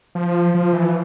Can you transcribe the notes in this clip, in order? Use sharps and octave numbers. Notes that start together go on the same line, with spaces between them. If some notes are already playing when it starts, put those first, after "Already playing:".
F3
F3
E3